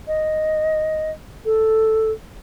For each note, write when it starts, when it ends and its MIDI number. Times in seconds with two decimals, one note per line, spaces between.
0.07 1.11 75
1.45 2.11 69